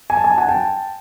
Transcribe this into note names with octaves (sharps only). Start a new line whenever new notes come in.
G#5
A5
G#5
A5
F#5 G#5
G5 A5